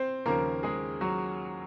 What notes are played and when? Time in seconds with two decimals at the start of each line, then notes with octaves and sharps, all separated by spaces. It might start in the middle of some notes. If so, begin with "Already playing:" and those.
Already playing: C4 C5
0.26 D#2 C#3 F3 A#3 A#4
0.63 G#3 G#4
1.01 F#3 F#4